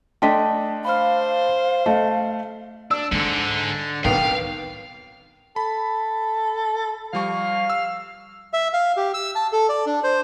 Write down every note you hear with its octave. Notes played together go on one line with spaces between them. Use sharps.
A3 D4 D#5 G5 C6 B6
C5 F5 B5 F6
A3 D#5
D4 E6
G#2 D3 D4
B1 D#3 B3 C4 F5 G5
A4 B5
F3 G3 F5 C#6
E6
E5
F5
G4
E6
A5
A4
D5
D4
C5